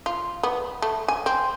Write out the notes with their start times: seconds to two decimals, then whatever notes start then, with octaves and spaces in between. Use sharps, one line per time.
0.06 F4
0.43 B3
0.82 A3
1.08 G#5
1.26 C4